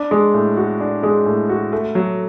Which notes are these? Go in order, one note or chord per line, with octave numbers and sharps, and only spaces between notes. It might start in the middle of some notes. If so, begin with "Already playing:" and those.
Already playing: D4
G#3
A2
F#4
D4
G#3
A2
F#4
A3
F#3